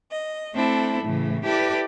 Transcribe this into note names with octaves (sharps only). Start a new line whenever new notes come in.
D#5
A3 C4 D4 E4 A4
A2 C#3 E3
E4 G4 A4 B4 D5